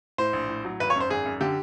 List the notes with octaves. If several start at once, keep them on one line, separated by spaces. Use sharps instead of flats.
A2 C5
A#1
A2
F#3
G#1 B4
C#5
F#2 C5
G#1 G#4
F#2
D3 G4